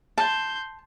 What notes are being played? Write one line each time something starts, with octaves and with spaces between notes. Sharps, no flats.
A5 C6 G6